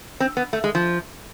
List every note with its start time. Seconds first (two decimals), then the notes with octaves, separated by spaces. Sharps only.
0.20 C4
0.37 B3
0.53 A3
0.64 G#3
0.75 F3